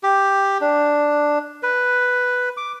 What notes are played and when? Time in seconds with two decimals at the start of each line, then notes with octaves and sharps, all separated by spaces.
0.03 G4
0.61 D4
1.63 B4
2.57 D6